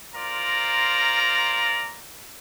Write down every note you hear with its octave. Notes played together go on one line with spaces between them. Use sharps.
F4 A#4 C5 D5 A#5